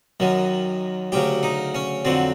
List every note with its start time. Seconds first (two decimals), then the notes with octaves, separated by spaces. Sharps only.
0.20 F#2 D#3 F#3
1.12 D2 C#3 F#3 G4
1.43 D#4
1.75 C#4
2.05 F2 D3 F#3 C4